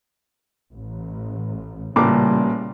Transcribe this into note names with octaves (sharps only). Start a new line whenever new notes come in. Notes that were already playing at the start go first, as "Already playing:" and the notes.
A1
A1 A#2 C#3 G3 D6